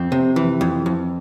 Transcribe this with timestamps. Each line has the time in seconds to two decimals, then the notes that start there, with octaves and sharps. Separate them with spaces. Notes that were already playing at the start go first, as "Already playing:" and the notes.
Already playing: F2 C4
0.12 C3
0.36 E3
0.61 F2
0.86 F2